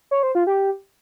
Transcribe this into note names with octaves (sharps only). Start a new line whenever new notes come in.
C#5
C5
F4
G4